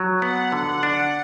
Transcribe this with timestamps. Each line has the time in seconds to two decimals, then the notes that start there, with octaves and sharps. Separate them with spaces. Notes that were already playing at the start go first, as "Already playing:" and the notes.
Already playing: F#3
0.22 B3 F#5
0.52 D3
0.83 D4